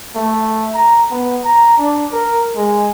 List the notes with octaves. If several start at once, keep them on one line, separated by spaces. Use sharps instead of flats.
A3
A#5
B3
A#5
D4
A#4
G#3